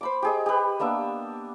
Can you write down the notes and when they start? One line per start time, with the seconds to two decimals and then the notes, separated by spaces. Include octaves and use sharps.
0.01 C5 B5 D6
0.22 G4 G#4 D#5
0.46 G4 B4
0.80 A#3 B3 D4 E5